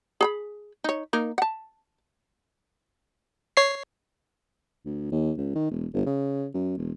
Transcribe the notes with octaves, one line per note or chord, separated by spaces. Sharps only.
G#4 A#5 B5
D#4 C#5
A#3 D#4 A#4
F#5 A5
C#5 C7
D2
D#2
C#2
D#3
E1
G1
C#3
F#2
E1